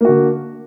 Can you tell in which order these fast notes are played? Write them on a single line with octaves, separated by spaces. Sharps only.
A#3 F#4 D3